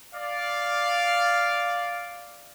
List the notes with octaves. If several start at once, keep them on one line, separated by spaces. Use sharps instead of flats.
D5 F5